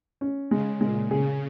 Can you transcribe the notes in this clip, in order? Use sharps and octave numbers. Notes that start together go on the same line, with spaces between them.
C#4
C#3 G#3
A#2 G#3
C#3 G#4